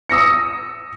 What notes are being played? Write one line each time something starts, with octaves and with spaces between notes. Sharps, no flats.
D#6 E6 A#6 C#7